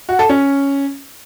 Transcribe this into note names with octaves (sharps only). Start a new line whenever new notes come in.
F#4
A4
C#4